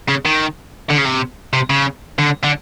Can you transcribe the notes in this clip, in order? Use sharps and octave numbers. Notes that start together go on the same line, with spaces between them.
C#3
D#3
D3
C#3
C3
C3
C#3
D3
D3